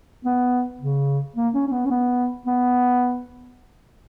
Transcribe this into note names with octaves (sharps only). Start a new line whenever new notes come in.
B3
C#3
A#3
C#4
C#4
B3
C#4
B3
B3